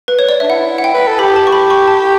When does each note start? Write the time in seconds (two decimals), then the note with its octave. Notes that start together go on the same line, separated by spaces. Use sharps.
0.08 B4
0.19 C#5
0.29 D5
0.40 D4 E5
0.50 E4 F#5
0.78 F#5
0.84 G5
0.94 B4
1.07 A4
1.19 G4 B5
1.36 A5
1.47 C#6
1.52 B5
1.70 C#6
1.88 A5